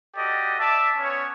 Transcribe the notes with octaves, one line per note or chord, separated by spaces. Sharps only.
F#4 G4 A4 D5 D#5
D5 E5 A5
B3 C#4 C#5